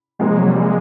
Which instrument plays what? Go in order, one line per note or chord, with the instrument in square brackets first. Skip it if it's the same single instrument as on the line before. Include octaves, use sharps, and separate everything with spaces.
[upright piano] C3 F3 A#3 D#4 [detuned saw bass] G#3
[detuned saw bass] F#3
G3
G#3